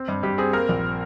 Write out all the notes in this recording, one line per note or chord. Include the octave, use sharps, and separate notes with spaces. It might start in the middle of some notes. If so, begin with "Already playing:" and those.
Already playing: C4
G2
G2 G4
C4 G#4
A#3 A#4
A#1